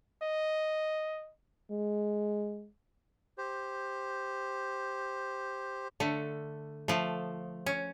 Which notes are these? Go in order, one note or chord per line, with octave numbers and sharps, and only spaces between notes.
D#5
G#3
G4 C5
D3 A3
F3 A3
C#4